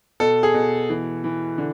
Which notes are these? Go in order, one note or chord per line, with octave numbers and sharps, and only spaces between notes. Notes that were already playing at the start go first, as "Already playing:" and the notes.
B2 A4
G#4
B2
E3
E3
D3